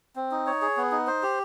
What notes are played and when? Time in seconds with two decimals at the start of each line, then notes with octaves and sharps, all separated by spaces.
0.16 C4
0.31 D#4
0.47 C#5
0.62 G#4
0.77 B3
0.92 D#4
1.07 C5
1.23 G4